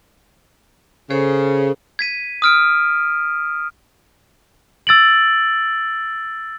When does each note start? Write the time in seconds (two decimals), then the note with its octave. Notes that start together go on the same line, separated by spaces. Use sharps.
1.10 C#3 G#4 A4 C5
1.99 G#6 B6 D#7
2.42 D#6 F6 D7
4.87 E6 A6 D7 F#7